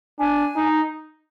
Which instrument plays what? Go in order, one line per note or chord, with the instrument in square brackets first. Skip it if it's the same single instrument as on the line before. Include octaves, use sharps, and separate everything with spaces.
[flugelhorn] D4 [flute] G#5
[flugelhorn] D#4